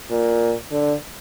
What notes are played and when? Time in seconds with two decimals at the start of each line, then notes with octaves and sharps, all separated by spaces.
0.11 A#2
0.72 D3